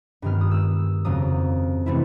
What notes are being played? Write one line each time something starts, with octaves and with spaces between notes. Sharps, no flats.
G2 D#3 G#3 B3 F6
D#6
E6
F2 C#3 F#3 A#3 D#6
C3 E3 A3 C4 E4